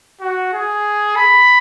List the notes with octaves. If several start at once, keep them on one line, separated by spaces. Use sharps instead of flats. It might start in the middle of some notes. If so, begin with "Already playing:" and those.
F#4
G#4
B5